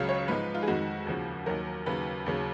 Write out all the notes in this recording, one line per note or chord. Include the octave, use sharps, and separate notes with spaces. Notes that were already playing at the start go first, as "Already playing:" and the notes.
Already playing: C#2 C#3 F#3 F5
C#5
G#2 F3 G#3 B4
F4
G#4
F2 D#3 G#3 F#4
D#2 C#3 F3
D#2 D#3 F#3 A#4
D#2 C#3 F#3 B4
D#2 C#3 F#3